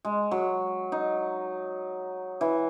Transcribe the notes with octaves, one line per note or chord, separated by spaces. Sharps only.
G#3
F#3
D#4
E3